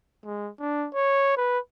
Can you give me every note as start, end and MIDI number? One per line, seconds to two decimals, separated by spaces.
0.25 0.50 56
0.60 0.88 62
0.94 1.35 73
1.37 1.58 71